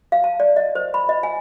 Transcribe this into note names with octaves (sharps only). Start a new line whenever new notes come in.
F5
A5
D5
D#5
C5
B5
D#5
G#5